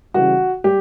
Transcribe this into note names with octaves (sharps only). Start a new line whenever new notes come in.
C#3 E3 G3 F#4
G3 G4